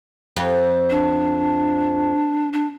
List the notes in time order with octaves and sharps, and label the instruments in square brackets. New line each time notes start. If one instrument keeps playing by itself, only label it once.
[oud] F2
[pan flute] D4
D4